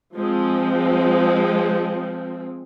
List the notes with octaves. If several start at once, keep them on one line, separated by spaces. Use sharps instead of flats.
F3 G#3 C4